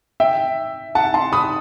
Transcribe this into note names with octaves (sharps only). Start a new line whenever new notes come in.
E5 G5
F#5 A5
A5 C6
B5 D#6